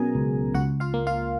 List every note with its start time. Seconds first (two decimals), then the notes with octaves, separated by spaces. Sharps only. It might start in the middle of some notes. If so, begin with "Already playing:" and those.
Already playing: B2 F#3 C#4 G#4 A#4 G#5 A#5
0.15 C#2
0.54 C#2 F#4 F#5
0.80 F4 F5
0.94 A#3
1.07 F4 F5